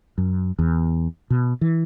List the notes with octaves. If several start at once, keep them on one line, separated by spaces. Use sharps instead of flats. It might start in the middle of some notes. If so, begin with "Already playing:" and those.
F#2
E2
B2
E3